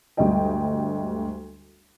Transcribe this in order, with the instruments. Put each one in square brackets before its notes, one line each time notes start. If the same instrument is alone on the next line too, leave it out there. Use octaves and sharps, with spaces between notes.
[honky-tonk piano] G1 D2 G3 G#3 D#5 G5